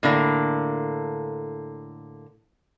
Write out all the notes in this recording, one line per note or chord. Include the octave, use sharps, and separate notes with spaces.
A2 D3 A#3